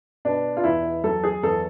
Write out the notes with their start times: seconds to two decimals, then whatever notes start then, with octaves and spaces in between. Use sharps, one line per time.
0.25 B2 D4
0.57 F4
0.64 E2 E4
1.04 F#3 A4
1.24 G#4
1.43 E2 A4